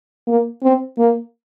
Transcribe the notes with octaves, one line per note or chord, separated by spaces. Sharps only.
A#3
C4
A#3